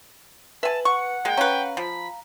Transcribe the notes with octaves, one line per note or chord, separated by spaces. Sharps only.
B4 E5 G#5 A5
F#5 C#6 C#7
G#3 A#3 G5
C#4 B4 F5 A#5
F3 B5